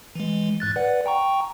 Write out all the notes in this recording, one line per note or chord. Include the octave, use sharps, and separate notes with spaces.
E3 G#3
G#2 F#6 A6
B4 D5 F#5
G5 A#5 C#6